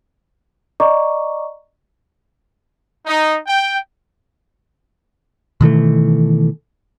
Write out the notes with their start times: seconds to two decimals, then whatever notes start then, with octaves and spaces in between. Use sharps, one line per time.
0.80 D5 D#5 A#5 C#6 D6
3.06 D#4
3.46 G5
5.61 B2 D#3 E3 A3